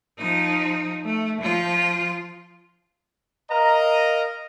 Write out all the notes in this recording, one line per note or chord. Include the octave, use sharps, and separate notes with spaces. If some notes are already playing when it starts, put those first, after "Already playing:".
F3 D#4
A3
F3 F4
A#4 D#5 F5 A#5